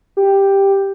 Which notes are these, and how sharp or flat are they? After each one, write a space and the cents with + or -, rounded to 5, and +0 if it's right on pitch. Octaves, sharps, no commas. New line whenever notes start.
G4 +5